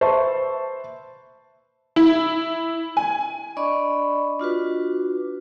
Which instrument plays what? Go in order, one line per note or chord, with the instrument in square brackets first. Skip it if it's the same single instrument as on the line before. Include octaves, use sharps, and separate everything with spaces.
[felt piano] B4 C5 E5 A5 B5 C#6
[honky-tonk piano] E4
G#5
[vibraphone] D4 D5 D#5 B5 C#6
D4 F4 F#4 B4